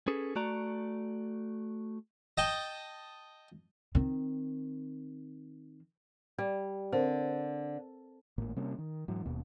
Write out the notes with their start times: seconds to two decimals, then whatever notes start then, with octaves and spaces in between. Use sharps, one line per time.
0.08 C#4 G#4 A4 B4
0.36 A3 F#4 D5 A#5
2.38 D#5 G5 A5
3.95 D#3 C4
6.38 G3 D5
6.93 D3 C4 A#4 C5
8.38 G#1 A2 A#3
8.56 C3 G3 A#3 C#4
8.78 D#3
9.08 G#2 E3 F#3
9.25 D#1 D#2 B2 A#3